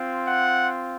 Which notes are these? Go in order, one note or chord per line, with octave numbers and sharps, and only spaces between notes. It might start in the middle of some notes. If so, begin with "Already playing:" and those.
Already playing: C4 F4
F#5